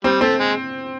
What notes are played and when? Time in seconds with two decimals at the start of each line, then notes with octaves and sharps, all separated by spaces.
0.04 G3 C4
0.21 A3 C4
0.39 G#3